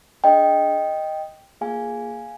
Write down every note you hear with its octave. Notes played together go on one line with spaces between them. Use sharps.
D4 G#4 D#5 G5
A#3 F4 G#4 F5 G#5